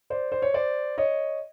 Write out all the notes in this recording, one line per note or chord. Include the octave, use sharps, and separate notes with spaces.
C5 D5
C5
C#5
C5 D5
C#5 D#5